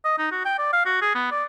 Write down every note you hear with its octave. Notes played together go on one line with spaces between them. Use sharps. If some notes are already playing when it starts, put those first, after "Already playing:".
D#5
D#4
F#4
G5
D5
F5
F#4
G#4
B3
D5